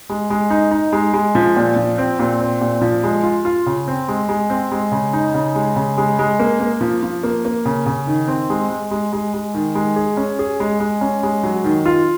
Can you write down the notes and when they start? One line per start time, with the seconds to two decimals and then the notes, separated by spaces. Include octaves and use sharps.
0.09 G#3
0.30 G#3
0.50 D#4
0.71 D#4
0.93 G#3
1.13 G#3
1.35 F3
1.57 A#2
1.76 F3
1.98 C4
2.19 A#2
2.41 C4
2.61 A#2
2.81 F3
3.04 G#3
3.23 F4
3.45 F4
3.66 C#3
3.88 C4
4.08 G#3
4.29 G#3
4.50 C4
4.71 G#3
4.92 C#3
5.13 D#4
5.34 C#3
5.55 G#3
5.76 C#3
5.97 G#3
6.19 G#3
6.40 A#3
6.60 A#3
6.81 F3
7.03 F3
7.23 A#3
7.45 A#3
7.65 C#3
7.86 C#3
8.07 D#3
8.28 C4
8.50 G#3
8.70 G#3
8.91 G#3
9.13 G#3
9.34 G#3
9.54 D#3
9.75 G#3
9.96 G#4
10.17 C#4
10.39 G#4
10.60 G#3
10.80 G#3
11.01 C#4
11.23 G#3
11.43 F#3
11.64 D#3
11.86 F4